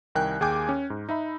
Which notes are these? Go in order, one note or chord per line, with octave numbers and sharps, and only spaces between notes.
C2 D#3 A#4 G5 G#5 F#6
D#2 G#4 G5 G#5 D6 G6
C#4
G#2
D#4 E5 B5